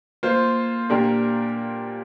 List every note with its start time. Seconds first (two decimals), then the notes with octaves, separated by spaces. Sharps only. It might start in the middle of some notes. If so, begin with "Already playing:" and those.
0.23 A#3 F4 C5
0.90 A#2 A#3 D4 G4 A#4